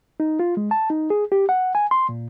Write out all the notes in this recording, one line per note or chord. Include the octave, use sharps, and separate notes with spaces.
D#4
F4
G#3
A5
D#4
G#4
G4
F#5
G#5
C6
A#2